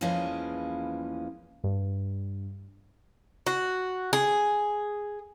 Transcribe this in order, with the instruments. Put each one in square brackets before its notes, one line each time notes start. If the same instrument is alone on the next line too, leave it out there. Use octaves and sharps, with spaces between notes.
[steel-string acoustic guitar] E2 E3 F3 G#3 A#3 C#4
[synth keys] G2
[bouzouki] F#4
G#4